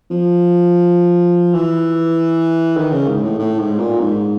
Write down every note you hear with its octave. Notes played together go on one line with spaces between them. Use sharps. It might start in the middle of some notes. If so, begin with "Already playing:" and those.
F3
E3
D#3
C#3
G#2
A2
A2
G#2
A#2
G#2